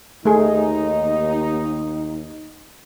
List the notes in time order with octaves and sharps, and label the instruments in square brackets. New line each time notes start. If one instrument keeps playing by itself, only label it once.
[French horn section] D#2 D#4 [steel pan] A3 G#4